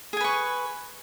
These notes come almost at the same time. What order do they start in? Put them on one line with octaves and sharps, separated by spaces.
G#4 G#5 B4 C#6